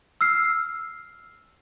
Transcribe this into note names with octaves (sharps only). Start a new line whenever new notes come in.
E6 F6 C7